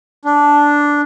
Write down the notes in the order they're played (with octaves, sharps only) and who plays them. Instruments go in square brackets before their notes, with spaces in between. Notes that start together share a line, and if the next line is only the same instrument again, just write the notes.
[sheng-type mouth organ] D4